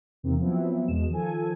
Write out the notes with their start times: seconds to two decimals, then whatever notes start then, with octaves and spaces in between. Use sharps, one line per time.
0.23 E2 C3 D#3 A#3 C4
0.39 F3 F#3 B3 C4 E4
0.88 E2 B2 G#3 E7
1.10 D#3 F3 A4 G#5